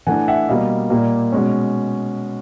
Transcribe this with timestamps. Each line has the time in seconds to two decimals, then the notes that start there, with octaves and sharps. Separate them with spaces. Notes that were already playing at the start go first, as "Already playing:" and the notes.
0.07 E3 A3 D4 F#5 G#5
0.28 E5 F#5
0.48 B2 G3 A#3 D#5 F5
0.90 A#2 G3 A#3
1.32 B2 G#3 C#4